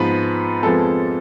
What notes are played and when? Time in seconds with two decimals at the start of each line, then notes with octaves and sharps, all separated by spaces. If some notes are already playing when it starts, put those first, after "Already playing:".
Already playing: G#2 F3 B3 B4
0.63 F2 F3 G#3 B3 A4